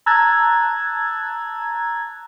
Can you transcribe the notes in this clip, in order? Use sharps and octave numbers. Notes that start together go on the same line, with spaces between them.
A5 A#5 E6 F#6 G#6 A6